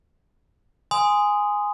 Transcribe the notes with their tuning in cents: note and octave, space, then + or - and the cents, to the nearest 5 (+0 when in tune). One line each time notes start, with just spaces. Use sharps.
G#5 -5 C6 -20 D#6 +0